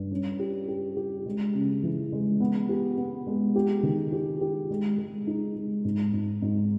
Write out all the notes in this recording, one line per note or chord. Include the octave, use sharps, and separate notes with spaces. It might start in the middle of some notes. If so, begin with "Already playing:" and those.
Already playing: G2
C#4
G4
G4
G4
G#3
C#3
E3
G#3
B3
G4
B3
G#3
G4
D#3
G4
G4
G#3
G#3
D#4
G#3
G#2
G#2
G#2